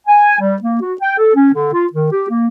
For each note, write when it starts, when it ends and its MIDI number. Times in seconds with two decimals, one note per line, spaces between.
0.07 0.39 80
0.40 0.56 55
0.62 0.77 58
0.81 0.94 66
1.01 1.18 79
1.18 1.30 69
1.34 1.49 61
1.53 1.70 50
1.73 1.85 65
1.92 2.09 51
2.11 2.27 67
2.29 2.48 58